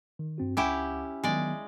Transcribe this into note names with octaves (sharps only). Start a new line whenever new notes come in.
D#3
G2 C4 F#4
C#2 C#4 E4 G4 F#5 D6
D#3 F#3 G#3 B3 D5